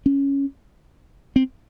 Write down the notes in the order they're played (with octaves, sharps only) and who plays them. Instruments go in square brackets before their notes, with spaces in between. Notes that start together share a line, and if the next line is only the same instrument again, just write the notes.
[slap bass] C#4
C4